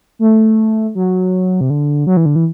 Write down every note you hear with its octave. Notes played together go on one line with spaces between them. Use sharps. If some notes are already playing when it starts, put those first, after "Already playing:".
A3
F#3
C3
D3
F#3
E3
D3
E3